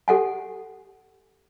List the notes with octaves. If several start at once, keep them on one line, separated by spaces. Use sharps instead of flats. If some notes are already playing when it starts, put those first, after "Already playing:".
G4 A4 F#5 G#5